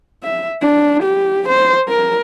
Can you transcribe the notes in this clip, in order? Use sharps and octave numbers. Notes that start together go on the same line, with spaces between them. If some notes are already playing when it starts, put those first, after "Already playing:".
E5
D4
G4
C5
A#4